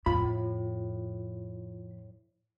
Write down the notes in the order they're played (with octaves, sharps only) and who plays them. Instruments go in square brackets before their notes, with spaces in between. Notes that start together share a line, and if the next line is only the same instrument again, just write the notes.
[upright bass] F2 [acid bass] A2 [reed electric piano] F4 [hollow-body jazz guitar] B5